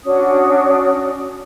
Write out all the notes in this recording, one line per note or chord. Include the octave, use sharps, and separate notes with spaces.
C#4 D4 F#4 D#6